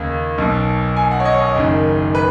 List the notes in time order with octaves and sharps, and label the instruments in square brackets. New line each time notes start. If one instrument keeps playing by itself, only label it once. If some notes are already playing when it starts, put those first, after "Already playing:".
Already playing: [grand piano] D#2 C#3
B1 B2
G#5
F#5
C#5
D#5
C#5
D#5
F#1 F#2 D#3
B4